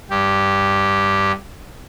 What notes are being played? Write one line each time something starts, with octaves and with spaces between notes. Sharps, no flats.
G2 G4